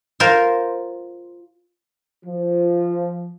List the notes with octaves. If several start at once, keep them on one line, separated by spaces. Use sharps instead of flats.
F4 A#4 C5
F3